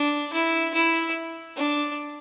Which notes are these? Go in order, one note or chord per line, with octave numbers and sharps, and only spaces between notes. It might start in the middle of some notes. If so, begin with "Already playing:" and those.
Already playing: D4
E4
E4
D4